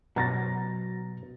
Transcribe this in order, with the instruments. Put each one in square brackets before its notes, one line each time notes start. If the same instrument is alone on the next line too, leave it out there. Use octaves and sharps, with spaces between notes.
[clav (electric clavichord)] B2 [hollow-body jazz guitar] F#3 [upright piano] A#5 A6 A#6